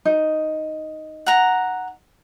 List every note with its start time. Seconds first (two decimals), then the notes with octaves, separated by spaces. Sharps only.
0.05 D#4
1.26 F#5 A#5